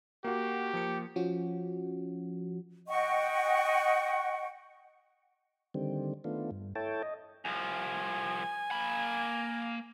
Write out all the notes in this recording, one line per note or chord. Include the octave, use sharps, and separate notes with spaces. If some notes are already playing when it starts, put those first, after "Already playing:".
A#3 F#4 G4
F3 A#3 C#7
F3 C#4 F#4
D#5 F#5 G5 C#6
D3 D#3 G3 C4
D#3 A3 B3 D4 F4
G2
E4 A4 C#5 G5 A5
D#5
C2 F3 G#5
A#3 B5